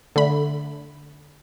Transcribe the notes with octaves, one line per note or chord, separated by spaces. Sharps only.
D3 A3 B5